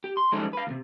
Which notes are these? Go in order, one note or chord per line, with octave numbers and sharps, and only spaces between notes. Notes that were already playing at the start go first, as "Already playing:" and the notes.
G4
C6
F3 G3 G#3 C#4 D#4 A4
B4 F5
D#2 C3